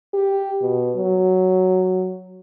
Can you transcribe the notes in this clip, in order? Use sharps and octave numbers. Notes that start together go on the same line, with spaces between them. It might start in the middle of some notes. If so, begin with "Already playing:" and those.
G4
B2
F#3